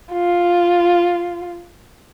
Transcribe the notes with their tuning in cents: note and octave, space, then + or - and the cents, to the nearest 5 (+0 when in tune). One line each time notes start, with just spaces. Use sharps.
F4 +0